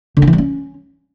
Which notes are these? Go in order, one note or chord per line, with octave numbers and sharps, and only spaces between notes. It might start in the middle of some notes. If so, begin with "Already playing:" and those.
D3
D4
E3
G3
C#4